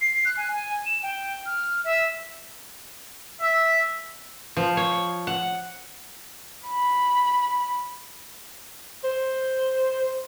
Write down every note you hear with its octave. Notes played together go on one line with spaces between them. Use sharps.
C7
F#6
G#5
G#5
E7
G5
F6
E5
E5
F3
C#5
F#5
B5
C5